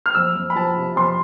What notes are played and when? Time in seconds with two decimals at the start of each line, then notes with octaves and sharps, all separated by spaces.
0.06 F6
0.15 F2 E6
0.35 F2
0.50 B5
0.56 F3 A5
0.77 C3
0.96 F2 C6